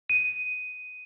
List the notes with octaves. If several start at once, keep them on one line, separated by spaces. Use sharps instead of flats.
D#7